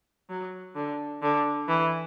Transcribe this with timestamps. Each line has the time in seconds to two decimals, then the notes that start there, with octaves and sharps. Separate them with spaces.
0.29 F#3
0.75 D3
1.22 D3
1.68 E3